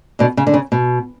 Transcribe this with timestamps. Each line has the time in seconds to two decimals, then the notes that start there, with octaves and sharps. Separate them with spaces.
0.19 B2 D3
0.37 C#3
0.47 D3
0.54 C#3
0.72 B2